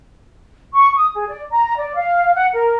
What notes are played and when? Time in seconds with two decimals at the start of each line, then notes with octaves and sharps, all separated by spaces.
0.74 C#6
0.97 D#6
1.15 G#4
1.29 D5
1.51 A#5
1.78 D5
1.96 F5
2.34 F#5
2.54 A#4